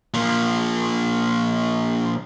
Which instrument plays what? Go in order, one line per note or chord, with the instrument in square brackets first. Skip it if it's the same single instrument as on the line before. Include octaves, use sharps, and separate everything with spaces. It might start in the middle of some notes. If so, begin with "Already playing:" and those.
[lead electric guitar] A#2 F3